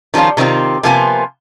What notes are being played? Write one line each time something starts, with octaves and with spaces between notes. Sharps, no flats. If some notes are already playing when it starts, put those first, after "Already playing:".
D#3 F3 G3 C#4 F4
C3 D#3 A3 C4 F4
C3 F3 A#3 B3 F4 G#5